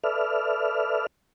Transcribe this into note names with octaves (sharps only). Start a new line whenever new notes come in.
A4 B4 D5 E5 F6